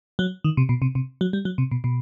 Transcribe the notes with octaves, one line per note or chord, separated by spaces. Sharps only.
F#3
D#3
C3
B2
C3
C3
F#3
G3
F#3
C3
B2
B2